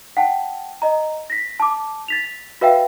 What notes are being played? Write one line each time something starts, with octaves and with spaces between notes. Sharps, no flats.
F#5 G5 A5
D#5 A#5
A#6 B6
A5 D6
A6 B6 F7
F#4 B4 E5 F5 G5